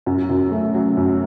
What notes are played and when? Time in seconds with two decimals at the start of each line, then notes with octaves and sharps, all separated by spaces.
0.06 F#2 F#4
0.30 F#2
0.51 A3
0.74 F#3
0.97 F#2